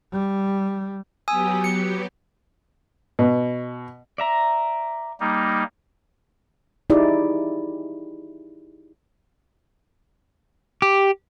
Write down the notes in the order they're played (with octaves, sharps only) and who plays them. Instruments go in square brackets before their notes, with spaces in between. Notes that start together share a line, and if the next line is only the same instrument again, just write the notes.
[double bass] G3
[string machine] F#3 B3 G4 [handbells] G#5 D#6 E6
[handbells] C#7
[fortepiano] B2
[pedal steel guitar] D5 E5 A#5
[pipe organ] G3 A#3 D#4
[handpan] D#4 E4 G4 G#4 D5
[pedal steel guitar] G4